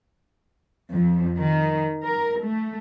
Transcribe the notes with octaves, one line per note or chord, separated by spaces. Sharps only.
F2
D#3
A#4
A3